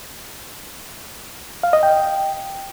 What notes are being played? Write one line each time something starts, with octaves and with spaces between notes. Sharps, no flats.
F5
D#5
G5